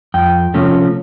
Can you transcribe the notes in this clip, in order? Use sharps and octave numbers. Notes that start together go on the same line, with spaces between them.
F2 G5
C3 F3 A3 C#4